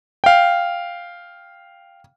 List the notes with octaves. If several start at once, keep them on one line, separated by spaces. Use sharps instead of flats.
F5 G5